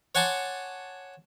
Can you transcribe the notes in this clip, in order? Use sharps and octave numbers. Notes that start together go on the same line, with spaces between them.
C#5 F#5 G#5 A5 C6 D6